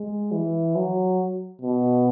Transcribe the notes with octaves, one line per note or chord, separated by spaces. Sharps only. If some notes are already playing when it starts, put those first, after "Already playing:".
Already playing: G#3
E3
F#3
B2